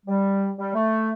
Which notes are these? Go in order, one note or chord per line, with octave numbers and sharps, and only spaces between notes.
G3
G3
A3